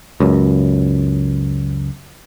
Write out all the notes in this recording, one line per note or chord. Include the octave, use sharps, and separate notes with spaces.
C#2 F#2